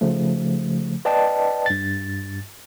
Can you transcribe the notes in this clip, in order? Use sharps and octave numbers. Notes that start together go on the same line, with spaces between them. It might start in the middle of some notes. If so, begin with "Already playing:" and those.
C#3 F3 A3
B4 D5 D#5 G5 A5
G2 A6